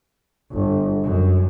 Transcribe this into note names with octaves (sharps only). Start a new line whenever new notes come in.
G1
F#2